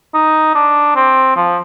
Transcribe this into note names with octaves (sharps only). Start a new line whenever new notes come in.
D#4
D4
C4
F3